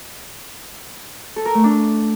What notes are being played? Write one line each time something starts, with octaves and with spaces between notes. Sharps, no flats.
A4
A#4
A3
D4